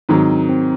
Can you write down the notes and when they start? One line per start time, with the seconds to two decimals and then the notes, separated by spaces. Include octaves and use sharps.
0.09 G#2 D#3 F#3 C4
0.49 C4